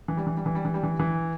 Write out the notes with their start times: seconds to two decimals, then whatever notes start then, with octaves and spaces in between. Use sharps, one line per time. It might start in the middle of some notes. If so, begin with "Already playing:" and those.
0.08 E3
0.17 G3
0.27 E3
0.37 G3
0.46 E3
0.55 G3
0.65 E3
0.74 G3
0.83 E3
1.00 E3